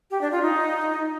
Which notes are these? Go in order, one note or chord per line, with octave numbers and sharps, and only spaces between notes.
G4
D4
F4
D#4